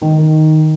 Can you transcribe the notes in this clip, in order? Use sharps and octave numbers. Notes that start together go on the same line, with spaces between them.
D#3